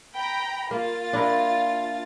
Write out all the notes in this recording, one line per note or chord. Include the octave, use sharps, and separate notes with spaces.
G5 A#5 B5
A#3 F4 A6
D4 E4 A#4